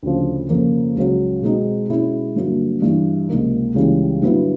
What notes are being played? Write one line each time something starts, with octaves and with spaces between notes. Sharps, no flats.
D2 C#3 F3
F2 C#3 F3 A#3
C#2 C#3 F#3
B2 G#3 C4 D#4
B2 G#3 C#4 E4
G2 D3 F#3 A#3
G2 E3 G3
C#2 C3 F3 A#3 D#4
C#2 C#3 E3 G3
G2 D3 F#3 B3 E4